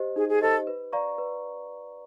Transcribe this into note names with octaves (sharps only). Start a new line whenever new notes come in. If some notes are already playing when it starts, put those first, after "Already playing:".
Already playing: G4 C5 D#5
D#4 G#4
G#4
G4 A4 C5 D#5
B4
D5 F5 A#5 C#6
B4